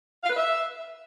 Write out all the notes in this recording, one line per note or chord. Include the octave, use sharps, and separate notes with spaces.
F5
B4
E5